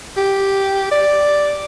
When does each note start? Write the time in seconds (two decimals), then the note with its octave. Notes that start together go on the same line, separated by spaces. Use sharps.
0.17 G4
0.92 D5